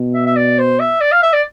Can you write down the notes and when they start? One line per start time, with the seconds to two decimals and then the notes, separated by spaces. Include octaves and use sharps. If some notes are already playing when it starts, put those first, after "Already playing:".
Already playing: B2
0.14 E5
0.26 E5
0.36 D5
0.58 C5
0.79 E5
1.01 D5
1.12 F5
1.23 E5
1.33 D5